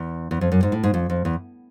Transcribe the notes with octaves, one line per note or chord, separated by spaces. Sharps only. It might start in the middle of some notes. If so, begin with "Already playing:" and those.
Already playing: E2
E2
F2
F#2
G#2
A2
G#2
F2
F2
E2